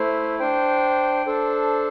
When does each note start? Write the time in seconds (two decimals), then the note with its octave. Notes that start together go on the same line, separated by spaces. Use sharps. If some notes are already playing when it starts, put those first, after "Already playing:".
Already playing: A3 E4 C5
0.39 D4 C5 G5
1.26 D4 A4 C5